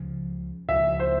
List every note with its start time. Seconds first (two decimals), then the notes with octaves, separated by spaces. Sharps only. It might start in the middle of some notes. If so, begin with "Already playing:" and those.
Already playing: C#2 C#3 F3
0.69 C#2 C#3 F3 E5
0.99 C5